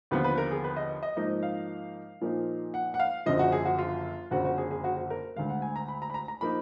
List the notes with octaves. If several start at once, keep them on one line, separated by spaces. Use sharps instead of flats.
D#2 D3 F3 B3 F4 B4
B4
A#4
G#4
B4
D#5
D#5
G#2 F3 A#3 D#4 D#5
F5
A#2 F3 A#3 D#4
F#5
F#5
F5
F#1 F#2 D3 F3 D#5
F#4
G#4
F#4
F4
F#1 F2 D3 F#4
F#4
G#4
G#4
F#4
F#4
A#4
D2 D3 G#3 F5
F#5
G#5
A#5
B5
A#5
B5
A#5
A#5
F3 A#3 D#4 B5